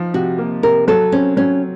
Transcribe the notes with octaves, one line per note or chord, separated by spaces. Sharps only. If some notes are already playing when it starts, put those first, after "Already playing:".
Already playing: F3 D#4
C3 F#4
A#3
C3 A#4
F#3 A4
C4 C#4
F#3 C#4